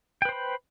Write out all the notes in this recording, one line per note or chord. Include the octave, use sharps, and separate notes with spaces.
B4 C5 G5 B5